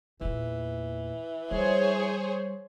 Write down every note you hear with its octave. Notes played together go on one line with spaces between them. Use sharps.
E2 A#2 E3
F3 G3 G#4 C5 C#5